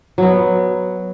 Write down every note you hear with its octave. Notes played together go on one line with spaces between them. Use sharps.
F#3 B3